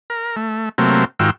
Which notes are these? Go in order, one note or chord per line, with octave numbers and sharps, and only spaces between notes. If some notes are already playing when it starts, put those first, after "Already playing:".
A#4
A3
C3 F#3 A3 A#3 C4
G#2 D#3 F4 F#4 G5 E6